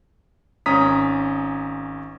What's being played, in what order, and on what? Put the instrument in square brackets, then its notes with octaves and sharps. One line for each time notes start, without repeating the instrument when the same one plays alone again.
[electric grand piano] G#1 C#4 A#5 D#6 B6